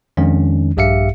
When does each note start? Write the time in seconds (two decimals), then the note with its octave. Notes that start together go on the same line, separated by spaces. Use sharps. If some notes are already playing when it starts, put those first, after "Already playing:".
0.17 F2 D#3 G#3 C#4 D4
0.77 A#1 G2 G4 E5 F5 C#7